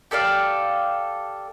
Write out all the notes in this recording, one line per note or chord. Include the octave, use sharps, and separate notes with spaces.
G4 A4 D5 F5